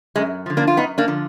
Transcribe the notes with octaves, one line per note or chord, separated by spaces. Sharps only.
F#2 G#3
D3 F3
A#3 D4
F4
F#2 B3 D#4
A#3 D4
D3 F3